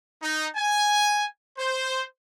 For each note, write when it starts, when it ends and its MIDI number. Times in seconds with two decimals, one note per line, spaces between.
0.22 0.47 63
0.56 1.26 80
1.58 2.03 72